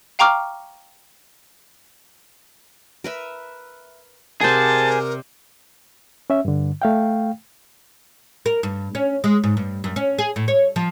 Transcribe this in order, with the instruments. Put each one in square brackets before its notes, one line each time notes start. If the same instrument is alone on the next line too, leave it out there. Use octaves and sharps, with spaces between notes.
[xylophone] F5 G5 A#5 C#6 D6 F6
[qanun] A#4 B4 E5
[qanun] C3 D5 F#5 [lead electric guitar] G#4 C5 [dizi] A#4 [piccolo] A5
[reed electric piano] C#4 E5
G2 D3
A3 F5 G5
[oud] A#4
G2
C#4
G#3
G#2
G2
F#2
C#4
G#4
A2
C#5
F3